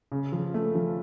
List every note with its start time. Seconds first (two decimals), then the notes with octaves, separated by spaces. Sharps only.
0.12 C#3
0.32 F3
0.54 A3
0.75 F3